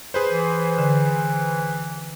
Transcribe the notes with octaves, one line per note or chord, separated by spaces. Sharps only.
G#4 B4 C5
E3
D3